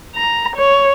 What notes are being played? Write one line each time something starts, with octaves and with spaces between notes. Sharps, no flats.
A#5
C#5